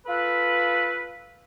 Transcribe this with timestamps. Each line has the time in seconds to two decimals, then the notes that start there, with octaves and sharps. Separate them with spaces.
0.07 F4 A4 B4